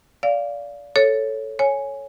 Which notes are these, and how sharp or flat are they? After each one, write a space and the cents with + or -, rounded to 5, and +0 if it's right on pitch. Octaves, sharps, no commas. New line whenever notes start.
D5 -25 F5 +0
A4 +0 C#5 +0
C#5 +0 G#5 +0